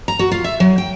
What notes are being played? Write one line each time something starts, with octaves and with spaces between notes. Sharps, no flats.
A#5
F#4
F4
E5
F#3
G5